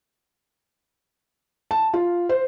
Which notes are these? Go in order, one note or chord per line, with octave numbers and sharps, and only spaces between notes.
A5
F4
C5